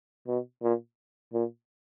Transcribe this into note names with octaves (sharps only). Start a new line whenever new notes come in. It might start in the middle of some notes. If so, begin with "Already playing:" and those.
B2
A#2
A#2